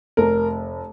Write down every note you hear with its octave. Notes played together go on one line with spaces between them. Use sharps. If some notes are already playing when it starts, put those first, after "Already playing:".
F1 A#4